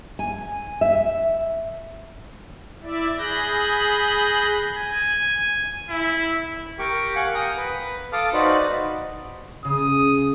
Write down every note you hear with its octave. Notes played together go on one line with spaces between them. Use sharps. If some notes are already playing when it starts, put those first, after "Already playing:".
G#5
E5
E4 D5 E5
G#4 B5 F#6 G6 A#6
G#5
E4
G4 A#4 G5 C#6 D6
F5 F#5 G#5
G5 A#5 D#6
B4
A4 F5 A5 D6 D#6 F6
D#4 F#4 B4 C5 D5
C#3 D#6